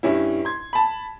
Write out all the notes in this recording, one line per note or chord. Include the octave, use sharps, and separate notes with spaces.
G2 C#4 E4
C6 G#6
A5 B5